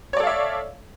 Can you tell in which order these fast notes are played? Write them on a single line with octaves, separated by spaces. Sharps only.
C#5 D5 A4 F5 E5